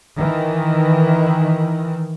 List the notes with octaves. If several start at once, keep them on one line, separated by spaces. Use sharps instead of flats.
D#3 E3